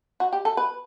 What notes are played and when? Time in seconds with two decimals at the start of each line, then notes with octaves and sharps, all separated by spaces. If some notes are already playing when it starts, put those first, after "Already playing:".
0.20 F#4
0.33 G4
0.45 A4
0.57 B4